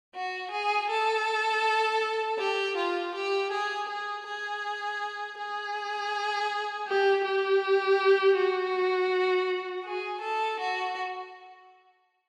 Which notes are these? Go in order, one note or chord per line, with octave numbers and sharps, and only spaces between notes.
F#4
G#4
A4
G4
F4
G4
G#4
G#4
G#4
G#4
G4
G4
F#4
G#4
A4
F#4